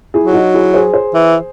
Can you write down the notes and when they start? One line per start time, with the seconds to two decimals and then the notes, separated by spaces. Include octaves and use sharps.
0.14 E4 G#4
0.24 F#3
0.33 D#4 F#4
0.54 E4 G#4
0.74 G#4 C5
0.94 G#4 C5
1.14 E3